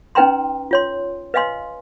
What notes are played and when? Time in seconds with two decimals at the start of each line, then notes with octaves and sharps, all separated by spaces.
0.15 C#4 D#4 B4 G5 A#5 C6
0.71 F4 C#5 C6
1.34 B4 D#5 F5 G#5 C6